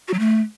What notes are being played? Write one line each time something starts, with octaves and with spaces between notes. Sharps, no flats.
F#4
F#3
A3